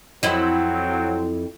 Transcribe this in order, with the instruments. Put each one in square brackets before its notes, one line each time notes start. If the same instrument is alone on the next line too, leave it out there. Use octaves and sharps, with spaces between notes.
[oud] F2 E4 D#5 [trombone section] F#3 C4